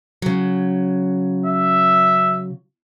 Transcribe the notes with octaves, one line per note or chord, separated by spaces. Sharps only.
C#3 F#3
E5